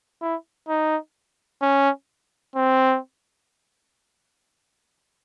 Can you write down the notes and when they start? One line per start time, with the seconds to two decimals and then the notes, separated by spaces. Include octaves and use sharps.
0.21 E4
0.68 D#4
1.62 C#4
2.56 C4